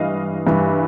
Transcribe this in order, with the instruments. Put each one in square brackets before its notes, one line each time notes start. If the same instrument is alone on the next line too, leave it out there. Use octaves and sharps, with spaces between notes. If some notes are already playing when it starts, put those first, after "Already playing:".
Already playing: [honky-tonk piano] G2 E3 D#5 F5
G2 E3